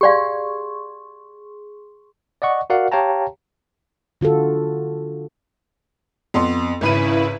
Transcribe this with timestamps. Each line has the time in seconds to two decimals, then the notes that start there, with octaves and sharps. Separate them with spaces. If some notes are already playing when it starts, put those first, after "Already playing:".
0.01 G4 G#4 D5 F5 C6 C#6
2.42 D5 D#5 F#5 C#6
2.70 F#4 A#4 D5 F5 F#5
2.92 G4 C#5 F5 G5 A5 A#5
4.21 D3 F4 F#4 A4
6.34 F2 B3 C6
6.81 G#1 C#3 E4 B4 B5 D#7